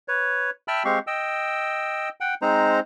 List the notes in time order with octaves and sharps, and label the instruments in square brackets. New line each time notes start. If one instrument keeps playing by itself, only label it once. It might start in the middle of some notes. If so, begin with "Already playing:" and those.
[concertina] B4 C#5
E5 G5 A5 B5 E6 F6
G#3 C4 G4 F5 C#6
D#5 G5 E6
F#5 G5
G#3 C4 D#4 C5 A#5